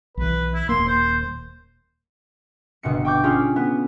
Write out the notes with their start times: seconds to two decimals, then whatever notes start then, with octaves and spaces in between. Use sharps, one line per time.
0.17 B1 E3 B4
0.54 E4
0.69 D#1 A#3 C6
0.87 C5
2.83 G1 B2 C4 C#7
3.05 G5 C#6 D6 G6
3.23 C#4 F4 G4 G#4
3.56 B3